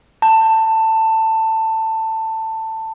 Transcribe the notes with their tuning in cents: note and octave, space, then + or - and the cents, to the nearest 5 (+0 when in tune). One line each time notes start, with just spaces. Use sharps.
A5 +15